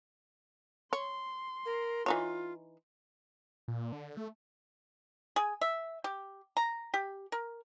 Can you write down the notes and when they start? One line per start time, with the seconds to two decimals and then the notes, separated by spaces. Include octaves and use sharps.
0.93 C#5 C6
1.66 A#4
2.06 E3 D#4 F4 C#5
3.68 A#2
3.92 D3
4.17 A3
5.36 G#4
5.61 E5
6.04 G4
6.57 A#5
6.94 G4
7.32 A#4